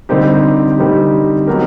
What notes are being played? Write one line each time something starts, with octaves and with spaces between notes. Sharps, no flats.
D3 G3 C4 D#4 G4
D3 G3 C4 D#4 G4
F#3 B3 D#4 G4 A#4